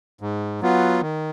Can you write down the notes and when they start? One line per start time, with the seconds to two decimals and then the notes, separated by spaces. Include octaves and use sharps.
0.21 G#2
0.61 F#3 B3 F4
1.01 D#3